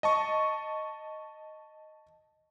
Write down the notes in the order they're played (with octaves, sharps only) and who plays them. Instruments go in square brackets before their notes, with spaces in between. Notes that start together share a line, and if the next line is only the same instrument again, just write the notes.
[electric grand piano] D#5 A5 C#6